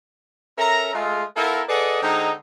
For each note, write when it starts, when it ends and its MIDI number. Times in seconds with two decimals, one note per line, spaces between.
0.58 0.90 61
0.58 0.90 69
0.58 0.90 70
0.58 0.90 76
0.58 0.90 82
0.94 1.23 56
0.94 1.23 57
0.94 1.23 65
1.36 1.62 59
1.36 1.62 64
1.36 1.62 65
1.36 1.62 69
1.36 1.62 70
1.69 1.98 68
1.69 1.98 69
1.69 1.98 71
1.69 1.98 74
1.69 1.98 75
1.69 1.98 78
2.02 2.32 50
2.02 2.32 56
2.02 2.32 60
2.02 2.32 63